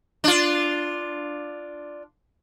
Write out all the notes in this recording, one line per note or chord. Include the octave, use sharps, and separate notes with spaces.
D4 F4